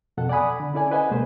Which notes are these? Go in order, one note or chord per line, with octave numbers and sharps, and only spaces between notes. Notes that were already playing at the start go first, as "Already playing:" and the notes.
F2 B2 A4 F#5
D5 F#5 G#5 B5 D#6
D3
C#4 E4 A4 D5 G#5
B4 C5 D#5 F#5 G#5
C#2 B2 G#3 A#3 C5